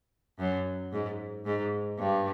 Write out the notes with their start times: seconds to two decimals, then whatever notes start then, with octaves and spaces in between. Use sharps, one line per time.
0.39 F#2
0.92 G#2
1.46 G#2
1.99 G2